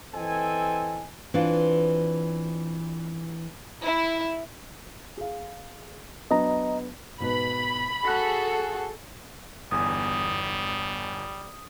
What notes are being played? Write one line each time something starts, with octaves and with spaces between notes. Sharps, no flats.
E3 C4 A4 D#5 G#5
E3 C4 D4 F4
E4
G#4 F5
F#3 B3 D4 D#5 A#5
G#2 B2 B4 B5
F#4 G#4 A4 F#6 A#6
G1 E2 G3 G#5 D#6